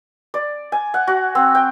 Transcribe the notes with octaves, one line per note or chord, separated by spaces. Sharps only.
D5
G#5
F#5
F#4
C4
G5